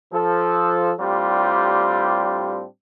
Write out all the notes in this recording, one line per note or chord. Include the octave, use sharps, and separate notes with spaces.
F3 A4
A2 G3 C4 D4 F4 G4